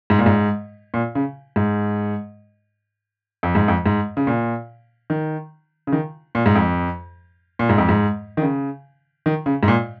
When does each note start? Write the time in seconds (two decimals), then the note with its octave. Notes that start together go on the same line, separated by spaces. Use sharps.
0.10 G#2
0.19 A#2
0.26 G#2
0.94 A#2
1.15 C#3
1.56 G#2
3.43 F2
3.55 G#2
3.68 F2
3.86 G#2
4.17 C#3
4.27 A#2
5.10 D#3
5.87 C#3
5.92 D#3
6.35 A#2
6.46 G#2
6.55 F2
7.59 A#2
7.69 G#2
7.78 F2
7.89 G#2
8.37 D#3
8.42 C#3
9.26 D#3
9.46 C#3
9.63 G#2
9.68 A#2